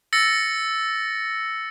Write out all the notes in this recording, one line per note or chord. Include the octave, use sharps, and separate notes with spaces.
E6 A6 A#6 C#7